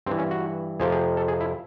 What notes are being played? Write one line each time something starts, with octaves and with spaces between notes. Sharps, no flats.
G2 E3 C4
C#4
F#4
F2 C3 F3 G#4
G#4
A4
G#4
E4